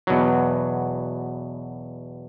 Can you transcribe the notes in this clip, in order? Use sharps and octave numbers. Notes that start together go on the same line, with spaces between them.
E2 B2 F#3